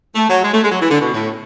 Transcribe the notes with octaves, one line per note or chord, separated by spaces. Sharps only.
A3
F#3
G#3
A3
G#3
F#3
E3
D3
B2
A2